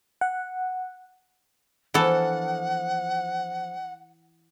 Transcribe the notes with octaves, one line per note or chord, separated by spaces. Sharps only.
F#5
E3 F3 B3 D4 A4 F#5